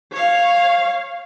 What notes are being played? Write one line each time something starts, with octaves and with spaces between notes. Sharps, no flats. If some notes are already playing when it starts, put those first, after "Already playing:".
C#5 F5